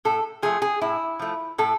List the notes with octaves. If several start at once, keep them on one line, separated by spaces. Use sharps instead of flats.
A2 A4
F3 A3 G#4
G#4
A2 E4
F3 A3
A2 A4